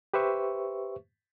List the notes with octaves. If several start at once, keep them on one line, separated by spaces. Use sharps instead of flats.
G4 B4 C5 E5 C#6